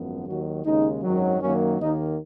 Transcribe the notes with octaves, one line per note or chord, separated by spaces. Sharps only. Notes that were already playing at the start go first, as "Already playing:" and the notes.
Already playing: G#1 F#2 F3 B3
D#2 D#3 F#3 F#4
D#2 C#3 G#3 D#4
G#1 F#2 D#3 F#3
F#2 D#3 F#3 A#3 C#4
D#2 D#3 A#3 D#4